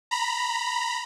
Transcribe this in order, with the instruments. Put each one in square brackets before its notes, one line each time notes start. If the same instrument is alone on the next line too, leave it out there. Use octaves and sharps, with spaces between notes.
[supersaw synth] A#5 B5